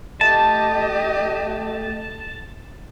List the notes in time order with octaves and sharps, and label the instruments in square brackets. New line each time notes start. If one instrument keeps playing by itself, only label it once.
[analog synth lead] A3 [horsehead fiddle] G4 D#5 [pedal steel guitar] A5